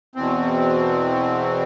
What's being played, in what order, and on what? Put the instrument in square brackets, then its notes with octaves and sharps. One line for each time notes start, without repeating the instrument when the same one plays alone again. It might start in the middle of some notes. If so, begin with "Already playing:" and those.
[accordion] E2 B2 C4